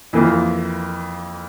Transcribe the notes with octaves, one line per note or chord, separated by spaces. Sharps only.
F2 E3 A#3 F4